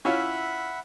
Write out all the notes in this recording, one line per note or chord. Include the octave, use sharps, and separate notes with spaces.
C#4 E4 F4 E5 F#5 B5